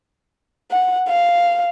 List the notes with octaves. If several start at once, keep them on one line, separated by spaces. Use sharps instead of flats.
F#5
F5